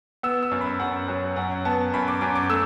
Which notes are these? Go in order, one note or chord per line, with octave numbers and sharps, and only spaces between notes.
B3 E6
E6
F#2
B5
F#2 F#5
F#3
F#2 F#5
B3 A5
F#2 B5
D6
F#2 D6
D6
A3 E6